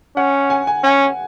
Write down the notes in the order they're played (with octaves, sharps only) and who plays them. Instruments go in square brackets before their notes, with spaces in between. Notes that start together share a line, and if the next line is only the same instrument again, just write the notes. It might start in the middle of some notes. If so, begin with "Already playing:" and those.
[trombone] C#4 [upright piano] F#5
[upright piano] G#5
G#5
[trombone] C#4